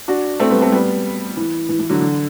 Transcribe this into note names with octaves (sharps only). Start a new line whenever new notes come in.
D4 F#4
A3 C4
G3 B3
A3 C4
G3 B3
E3
E3
E3
D3 F#3
D3